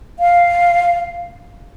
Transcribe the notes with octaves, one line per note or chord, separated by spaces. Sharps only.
F5